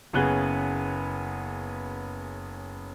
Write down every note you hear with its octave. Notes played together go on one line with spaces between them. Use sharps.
F#1 C#3 B3 G#4 F#6 G7